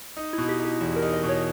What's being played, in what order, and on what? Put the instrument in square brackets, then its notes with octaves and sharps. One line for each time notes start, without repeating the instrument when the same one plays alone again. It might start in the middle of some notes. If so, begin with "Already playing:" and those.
[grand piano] D#4
[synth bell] E4
[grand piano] B2
[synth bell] G4
[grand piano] D#4
[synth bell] G4
[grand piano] E2
[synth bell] A#4
[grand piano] D#4
[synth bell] D#5
[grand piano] B2
[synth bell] C#5